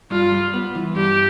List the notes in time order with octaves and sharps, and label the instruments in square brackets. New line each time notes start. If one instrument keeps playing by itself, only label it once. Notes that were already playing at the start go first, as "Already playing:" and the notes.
[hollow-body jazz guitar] G2 [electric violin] F4
[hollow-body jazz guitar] G3
B3
E3
[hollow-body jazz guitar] G2 [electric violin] G4